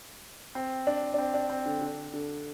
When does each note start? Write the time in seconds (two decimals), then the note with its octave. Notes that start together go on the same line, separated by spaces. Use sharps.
0.55 C4
0.87 D4
1.14 D4
1.18 C4
1.34 D4
1.50 C4
1.66 D3
1.81 D3
2.13 D3